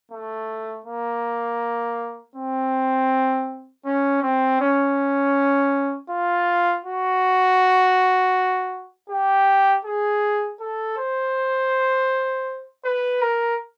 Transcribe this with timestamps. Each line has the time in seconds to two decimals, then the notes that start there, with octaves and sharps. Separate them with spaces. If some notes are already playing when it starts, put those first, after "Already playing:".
0.11 A3
0.85 A#3
2.35 C4
3.85 C#4
4.22 C4
4.60 C#4
6.09 F4
6.85 F#4
9.09 G4
9.85 G#4
10.60 A4
10.97 C5
12.85 B4
13.21 A#4